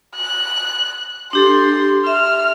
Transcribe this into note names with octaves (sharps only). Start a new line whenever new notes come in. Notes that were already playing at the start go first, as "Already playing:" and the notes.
F#6
D4 G4 A4 C6
E5 F6